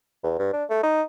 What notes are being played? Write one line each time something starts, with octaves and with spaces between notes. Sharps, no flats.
E2
G2
D4
A3
D#4